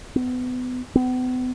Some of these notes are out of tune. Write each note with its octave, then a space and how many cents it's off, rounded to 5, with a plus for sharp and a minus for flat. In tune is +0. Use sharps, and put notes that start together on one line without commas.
B3 +30
B3 +40